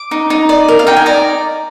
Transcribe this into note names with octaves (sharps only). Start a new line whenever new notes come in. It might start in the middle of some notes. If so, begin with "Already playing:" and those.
Already playing: D6
D#4
D#4
D5
A#4
F5
D#4 G5
G#5
D5 A#5